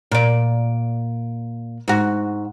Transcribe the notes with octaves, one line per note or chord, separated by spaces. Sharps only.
A#2 D5
G#2 F#4